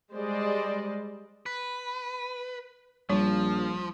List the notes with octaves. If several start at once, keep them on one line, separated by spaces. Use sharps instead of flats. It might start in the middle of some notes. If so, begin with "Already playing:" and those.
G3 G#3 C5 D5 D#5
B4
A#1 F3 G3